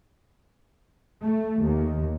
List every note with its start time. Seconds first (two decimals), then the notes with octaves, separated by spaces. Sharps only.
1.23 A3
1.61 D#2